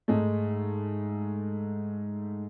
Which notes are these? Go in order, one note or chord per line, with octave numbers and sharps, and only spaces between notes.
G#2 G#3 A3